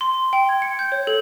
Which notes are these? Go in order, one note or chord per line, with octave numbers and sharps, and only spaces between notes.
C6
G5
G#6
C#7
G6
C#5
A4